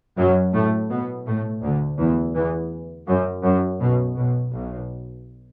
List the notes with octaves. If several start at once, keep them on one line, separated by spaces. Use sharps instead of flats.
F#2 F#3
A2 A3
B2 B3
A2 A3
D2 D3
E2 E3
E2 E3
F#2
F#2
B1 B2
B1 B2
B1 B2